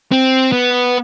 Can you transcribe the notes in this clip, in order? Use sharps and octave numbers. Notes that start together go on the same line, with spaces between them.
C4
B3